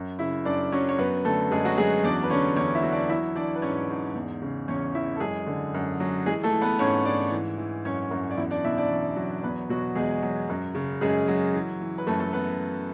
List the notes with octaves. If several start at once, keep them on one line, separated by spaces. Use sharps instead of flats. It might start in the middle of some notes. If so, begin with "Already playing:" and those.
Already playing: F#2
C#3 E4 E5
F#2 D4 D5
F#3 C#4 C#5
C#5
F#2 B3 B4
D3 A3 A4
F#2 G#3 G#4
F#3 F#4
F#3 G#3 G#4
E2 D4 D5
B4
D3 C#4 C#5
E2 C#4 C#5
E4 E5
F#3
D4 D5
E3 E4 E5
E3 D4 D5
B4
G#2 C#4 C#5
G#2
E2
C#3
E2 C#4 C#5
E3 E4 E5
A4
F#2 G#3 G#4
D3
F#2
F#3
E3 G#3 G#4
A3 A4
E3
B3 B4
G#2 C#4 C#5
G#2 D4 D5
E3
E3
F#2 C#4 C#5
F#2
D5
E2 E4 E5
D4 D5
B2 E4 E5
D4 D5
E2
F#3
E2 B3 B4
B2 F#3 F#4
E2 G#3 G#4
F#3
F#2
C#3
F#2 G#3 G#4
F#3
E3
E3
B4
F#2 A3 A4
A3 A4
B3 B4